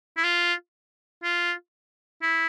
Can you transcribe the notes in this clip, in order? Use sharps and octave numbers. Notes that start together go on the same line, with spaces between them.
E4
F4
F4
E4